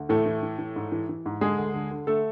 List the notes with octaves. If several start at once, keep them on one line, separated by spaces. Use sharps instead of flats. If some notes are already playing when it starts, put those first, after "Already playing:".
Already playing: D2
A2 E3 A3
E3
E3
E3
G#2
E3
E3
G#2
D3 G#3 G#4
D2
D3
D3
D3 A3 A4